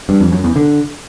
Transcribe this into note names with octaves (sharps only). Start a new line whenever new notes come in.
G2
F2
F#2
E2
D3